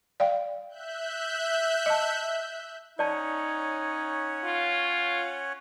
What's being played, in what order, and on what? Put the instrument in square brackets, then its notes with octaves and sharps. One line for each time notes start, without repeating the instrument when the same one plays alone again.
[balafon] D5 F5 G5
[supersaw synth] E5 F#6 G6
[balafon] D#5 A5
[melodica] C#4 C#5 F#5 [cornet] D#4 [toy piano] D5 A5
[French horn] F4